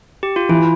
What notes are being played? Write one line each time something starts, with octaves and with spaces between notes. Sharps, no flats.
G4
F4
E3 E4